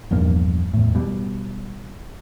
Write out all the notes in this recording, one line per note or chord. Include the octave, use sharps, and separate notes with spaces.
A#1 E2 G2 A#3
E2 A2
B2 G3